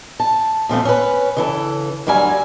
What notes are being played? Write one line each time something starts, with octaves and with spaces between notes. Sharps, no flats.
A5
A#2 F3 A3 C4
C#4 B4
C#3 E3 A4
D2 F#3 G3 F5 G#5